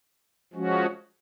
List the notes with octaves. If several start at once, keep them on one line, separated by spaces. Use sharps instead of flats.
F3 G#3 C#4 F#4